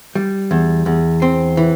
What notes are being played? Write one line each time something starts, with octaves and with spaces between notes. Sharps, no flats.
G3
E2
E2
C4
E3